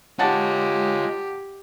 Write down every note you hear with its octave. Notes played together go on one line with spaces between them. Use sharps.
G#3 F4 G4 C#5 F#5 A5 A6